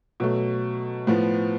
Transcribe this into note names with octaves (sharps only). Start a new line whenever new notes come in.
B2 F#3 A3
A2 F3 B3